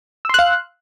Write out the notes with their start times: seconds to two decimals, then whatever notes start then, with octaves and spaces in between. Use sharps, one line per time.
0.25 E6
0.29 C6
0.34 F#6
0.39 F5